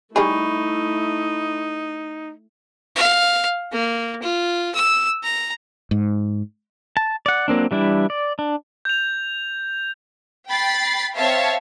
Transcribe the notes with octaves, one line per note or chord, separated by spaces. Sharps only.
G3 A3 D#4 E4 G#4 B5 C#6
F5
A#3
F4
E6
A#5
G#2
A5
D5 F#5
F#3 A#3 C4 D4
E3 G3 D4 E4
D5
D4
G6 F7
G5 B5 A6 C7
C4 C#5 E5 F5 A5